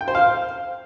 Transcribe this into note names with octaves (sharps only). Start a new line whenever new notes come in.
G5
C5
F5